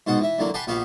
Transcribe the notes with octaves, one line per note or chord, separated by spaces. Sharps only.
G#2 B2 C5 F#5
E3 E5
D2 D3 E3 F#3 A#3
G4 B4 F#5 G#5 A5 C6
A#1 B3 F#4 G4 F5